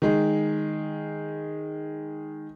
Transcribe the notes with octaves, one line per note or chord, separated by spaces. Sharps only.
D#3 G#3